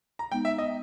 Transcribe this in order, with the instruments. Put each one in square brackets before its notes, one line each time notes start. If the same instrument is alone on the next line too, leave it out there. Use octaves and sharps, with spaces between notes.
[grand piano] A#5
[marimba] G#3 B3 D#4 [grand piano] G5
[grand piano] E5
D#5